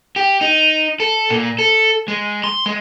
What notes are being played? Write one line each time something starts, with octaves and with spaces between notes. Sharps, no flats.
G4
D#4
A4
A#2
A4
G#3
C6
G#3